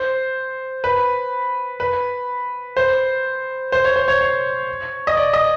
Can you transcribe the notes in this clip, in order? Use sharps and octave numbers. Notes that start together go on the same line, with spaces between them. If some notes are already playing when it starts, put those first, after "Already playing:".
Already playing: C5
B4
B4
C5
C5
C#5
C5
C#5
C#5
D#5
D5
D#5